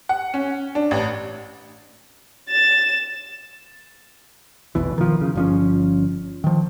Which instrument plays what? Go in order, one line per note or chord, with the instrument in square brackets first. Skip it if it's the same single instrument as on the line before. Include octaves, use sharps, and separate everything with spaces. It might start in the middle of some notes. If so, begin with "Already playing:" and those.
[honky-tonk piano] F#5
C#4
D4
A1
[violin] A6 E7
[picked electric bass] F1 B1 B2 E3
D#3 F3
C#3
G1 F3 C#4
D#3 F3